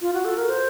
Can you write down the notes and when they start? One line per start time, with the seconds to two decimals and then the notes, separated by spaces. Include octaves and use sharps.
0.01 F4
0.14 F#4
0.25 A4
0.37 A#4
0.49 C5